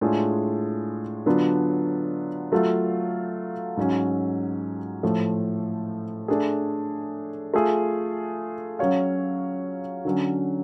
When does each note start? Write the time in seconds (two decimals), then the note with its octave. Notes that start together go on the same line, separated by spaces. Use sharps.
0.01 A2 G#3 D4 F4 G#4
1.26 D3 F#3 B3 D4 F4
2.52 F#3 A3 F4 A4 F5
3.77 G#2 F#3 C#4
5.03 A2 F3 A3
6.28 A3 D4 G#4
7.54 A3 F4 G#4
8.79 F#3 C#4 F#4 C#5 F5
10.05 D3 F#3 C#4